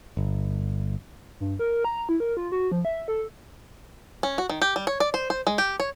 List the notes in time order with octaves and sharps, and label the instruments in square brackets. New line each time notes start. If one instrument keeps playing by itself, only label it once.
[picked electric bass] G1
[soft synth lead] G2
A#4
A#5
E4
A#4
F4
F#4
F3
E5
A4
[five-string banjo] C#4
F#4
D#3
G4
G3
C#5
D5
C5
C5
G#3
G4
C#5